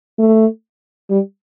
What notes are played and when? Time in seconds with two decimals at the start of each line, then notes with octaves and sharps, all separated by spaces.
0.18 A3
1.10 G3